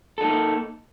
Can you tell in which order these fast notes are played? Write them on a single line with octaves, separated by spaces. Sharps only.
A4 D#4 A#3